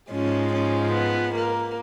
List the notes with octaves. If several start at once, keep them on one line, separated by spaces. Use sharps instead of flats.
G#2 F3 G#3 C#4
C#4
B3
A#3